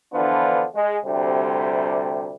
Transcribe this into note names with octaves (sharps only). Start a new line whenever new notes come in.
D3 E3 F3 B3 D4 F4
G#3
D2 C3 G3